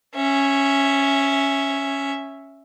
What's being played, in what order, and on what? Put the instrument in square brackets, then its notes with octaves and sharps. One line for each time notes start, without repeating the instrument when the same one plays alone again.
[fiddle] C#4 E5